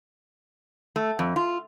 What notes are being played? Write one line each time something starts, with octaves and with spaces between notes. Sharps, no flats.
A3
F2
F4